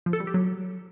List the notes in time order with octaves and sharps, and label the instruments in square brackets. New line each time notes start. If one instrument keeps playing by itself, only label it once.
[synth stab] F3
A4
G3
G4
F#3